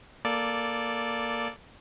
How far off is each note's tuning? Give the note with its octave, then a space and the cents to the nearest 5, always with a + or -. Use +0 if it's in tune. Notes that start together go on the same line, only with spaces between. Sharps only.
A#3 +0 A4 -10 D5 +0